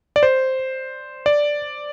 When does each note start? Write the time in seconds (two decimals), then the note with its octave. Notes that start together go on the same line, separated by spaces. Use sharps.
0.16 D5
0.23 C5
1.26 D5